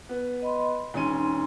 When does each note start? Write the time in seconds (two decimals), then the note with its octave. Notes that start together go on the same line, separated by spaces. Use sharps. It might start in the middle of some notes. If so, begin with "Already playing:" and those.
0.09 B3
0.42 D#5 B5 C6
0.94 E1 C#4 D#4 C6 D#7